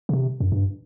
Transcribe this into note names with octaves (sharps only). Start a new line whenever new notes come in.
C#3
C3
F#2
G2